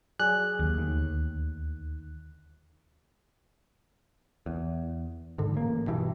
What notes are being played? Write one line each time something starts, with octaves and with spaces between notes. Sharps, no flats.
F#3 G#4 D5 F#6
D#2
D2 D#3
E2
G#2 D3
A1 A#3
G2 B2 E3